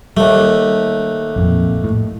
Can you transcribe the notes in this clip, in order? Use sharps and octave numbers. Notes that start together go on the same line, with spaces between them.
D#2 G3 A3
A#1 F2
A2